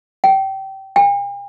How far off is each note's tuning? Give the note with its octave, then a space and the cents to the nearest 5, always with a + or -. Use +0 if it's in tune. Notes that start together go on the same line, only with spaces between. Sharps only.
G5 -25
G5 +45